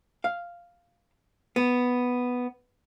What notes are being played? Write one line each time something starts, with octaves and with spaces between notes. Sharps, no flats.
F5
B3